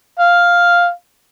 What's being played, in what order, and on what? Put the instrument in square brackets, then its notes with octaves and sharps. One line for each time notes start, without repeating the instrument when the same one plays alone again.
[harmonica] F5